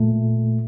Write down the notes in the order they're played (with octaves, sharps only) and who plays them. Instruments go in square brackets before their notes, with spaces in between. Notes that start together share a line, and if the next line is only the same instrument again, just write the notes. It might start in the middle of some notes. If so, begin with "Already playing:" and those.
Already playing: [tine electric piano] A#2 A3